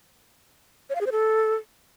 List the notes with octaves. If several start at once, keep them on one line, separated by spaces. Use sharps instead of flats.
C#5
F5
G#4
C5
A4